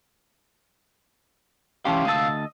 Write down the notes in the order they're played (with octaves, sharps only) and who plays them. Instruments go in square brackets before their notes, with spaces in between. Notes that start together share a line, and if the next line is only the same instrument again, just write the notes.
[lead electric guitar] C3 F5 [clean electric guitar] E3 C#4 G4 [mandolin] A5 C6
[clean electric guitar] D2 A5 [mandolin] D#5 E6